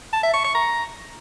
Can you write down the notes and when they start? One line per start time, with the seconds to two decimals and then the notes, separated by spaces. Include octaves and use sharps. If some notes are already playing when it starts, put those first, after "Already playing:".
0.13 A5
0.23 E5
0.34 C#6
0.44 C#6
0.55 A#5